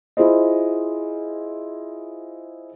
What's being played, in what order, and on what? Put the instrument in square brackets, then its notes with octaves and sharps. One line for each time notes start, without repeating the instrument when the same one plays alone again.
[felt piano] E4 F4 G#4 C5 D#5